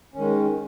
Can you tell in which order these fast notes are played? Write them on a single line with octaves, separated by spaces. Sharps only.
C#4 D#3 G#3